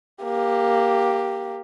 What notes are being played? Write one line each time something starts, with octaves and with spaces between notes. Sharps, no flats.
A#3 G4